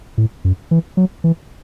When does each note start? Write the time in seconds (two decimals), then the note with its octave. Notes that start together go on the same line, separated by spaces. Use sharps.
0.18 A2
0.45 F#2
0.71 E3
0.97 F#3
1.24 E3